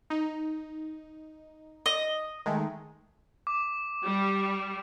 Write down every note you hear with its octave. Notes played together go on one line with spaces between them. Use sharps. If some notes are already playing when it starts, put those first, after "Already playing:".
D#4
D#5
D#3 G#3 A3
D6
G3